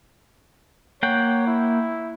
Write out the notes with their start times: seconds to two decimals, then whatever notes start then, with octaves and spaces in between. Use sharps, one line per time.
1.03 A#3 C#5 F#5 G5
1.47 E4